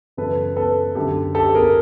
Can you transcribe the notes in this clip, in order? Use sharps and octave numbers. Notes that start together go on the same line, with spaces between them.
F#2 C#3 E3 A4 B4
A4 B4
F#2 D3 G4 A4
G4 A4
G#4 A#4